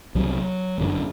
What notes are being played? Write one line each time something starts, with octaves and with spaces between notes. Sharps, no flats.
C2 C3 F#3
G1 F#2 D3